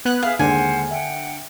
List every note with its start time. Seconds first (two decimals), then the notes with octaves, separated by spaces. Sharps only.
0.05 B3 F#6 G#6
0.23 G#4 E5 F5 D#6 F6
0.39 D#2 D3 G#3 C5 F#5 G#5
0.91 E5 F#5 G5